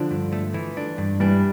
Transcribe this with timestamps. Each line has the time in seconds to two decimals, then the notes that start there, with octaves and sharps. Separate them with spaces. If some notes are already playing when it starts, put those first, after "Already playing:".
Already playing: D3 F3 D4
0.11 G2
0.33 A3
0.54 E3
0.77 D4
0.98 G2
1.20 E3 G3 D4